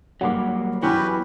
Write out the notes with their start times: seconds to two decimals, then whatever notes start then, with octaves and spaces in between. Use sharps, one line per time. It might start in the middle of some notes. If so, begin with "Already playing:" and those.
0.21 F#3 G3 A#3 F#5 D6
0.82 E3 F#3 B3 C#4 F#4 G4 B4 B5